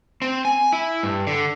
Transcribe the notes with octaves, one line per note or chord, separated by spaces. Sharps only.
C4
G#5
E4
G2
D3